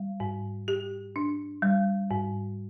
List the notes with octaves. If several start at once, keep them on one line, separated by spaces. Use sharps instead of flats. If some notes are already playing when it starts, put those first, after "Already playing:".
Already playing: G3
G#2
G4
D4
G3
G#2